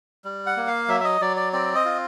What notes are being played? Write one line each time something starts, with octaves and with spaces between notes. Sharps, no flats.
G3
F#5
A#3
F5
F#3 E5
E5
D#5
F#3 D5
D5
C4 D5
D#5
F4